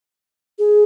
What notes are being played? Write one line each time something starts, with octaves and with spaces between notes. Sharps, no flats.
G#4